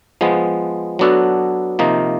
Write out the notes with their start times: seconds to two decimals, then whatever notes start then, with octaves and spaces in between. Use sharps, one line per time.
0.21 F3 G#3 B3
0.99 F#3 B3 D4 F#4 A4
1.79 C3 F3 A#3 D#4